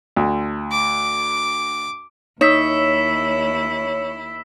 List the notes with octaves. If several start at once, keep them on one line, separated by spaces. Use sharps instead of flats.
D2
D6
D#2 D#4 E4 C#5 E6 B6 E7